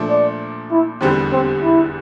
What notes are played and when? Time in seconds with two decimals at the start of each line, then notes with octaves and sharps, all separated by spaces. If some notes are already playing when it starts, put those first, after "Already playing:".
Already playing: A#2 F3 A3 D4
0.09 D5
0.71 E4
1.01 F1 E2 D3 G3 C4
1.32 C4
1.62 E4